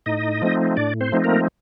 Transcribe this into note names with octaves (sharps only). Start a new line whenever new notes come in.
A2 D#4 D#5
F3 A3 C4 D#4
A2 D4 D5
C4 C5
F3 A3 C4 D#4
A#3 A#4